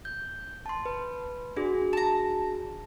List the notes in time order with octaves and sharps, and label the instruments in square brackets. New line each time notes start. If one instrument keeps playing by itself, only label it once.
[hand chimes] G6
A5 C6
B4
D4 F#4 G#4
[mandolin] A5 A#5